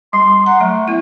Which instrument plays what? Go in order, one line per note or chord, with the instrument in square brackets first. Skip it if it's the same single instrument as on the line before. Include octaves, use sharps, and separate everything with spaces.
[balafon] G3 [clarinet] C6
[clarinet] F#5 [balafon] A#5
[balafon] F#3 [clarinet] A3
[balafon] B3 E4